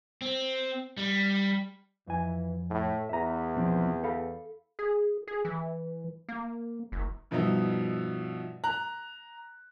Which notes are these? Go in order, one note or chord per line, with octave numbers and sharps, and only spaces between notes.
C4
G3
F2 E3 G#5
A2
E2 E5 A#5
B1 F3 C4
A4 F5 B5
G#4
G#4
E3
A#3
F#1
G2 B2 F3 D#4 E5
A#5 F#6